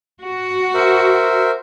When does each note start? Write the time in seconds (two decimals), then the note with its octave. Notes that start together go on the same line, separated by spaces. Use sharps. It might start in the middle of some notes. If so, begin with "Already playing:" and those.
0.21 F#4
0.75 A#4 C5 E5